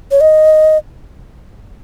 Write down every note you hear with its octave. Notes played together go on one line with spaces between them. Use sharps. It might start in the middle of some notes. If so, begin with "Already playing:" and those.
C#5
D#5